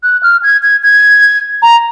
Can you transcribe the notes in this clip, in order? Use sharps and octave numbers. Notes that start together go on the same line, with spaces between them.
F#6
F6
G#6
G#6
G#6
A#5